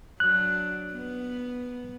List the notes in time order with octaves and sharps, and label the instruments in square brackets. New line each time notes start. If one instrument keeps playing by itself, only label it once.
[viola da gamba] F#3 D4 [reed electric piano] F#6
[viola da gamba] B3